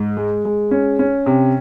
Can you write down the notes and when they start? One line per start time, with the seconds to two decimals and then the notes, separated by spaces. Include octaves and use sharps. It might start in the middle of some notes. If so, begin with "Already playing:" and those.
Already playing: G#2
0.17 G#3
0.45 G#3
0.71 C#4
0.99 C#4
1.26 C3